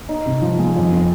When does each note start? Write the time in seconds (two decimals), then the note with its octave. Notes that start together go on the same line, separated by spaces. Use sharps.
0.09 D#4
0.26 C3
0.42 F3
0.59 G#3
0.76 F2
0.92 C4